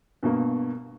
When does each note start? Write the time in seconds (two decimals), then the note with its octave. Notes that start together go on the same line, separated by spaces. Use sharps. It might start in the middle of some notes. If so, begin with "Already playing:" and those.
0.23 G2 B2 A#3